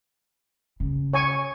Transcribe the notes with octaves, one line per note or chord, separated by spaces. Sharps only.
C#3
C#5 G#5 C#6